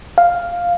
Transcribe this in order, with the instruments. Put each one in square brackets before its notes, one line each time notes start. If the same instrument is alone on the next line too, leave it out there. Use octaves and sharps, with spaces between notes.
[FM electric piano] F5